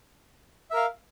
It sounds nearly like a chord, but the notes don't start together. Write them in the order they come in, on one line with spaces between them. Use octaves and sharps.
E5 A#4 F5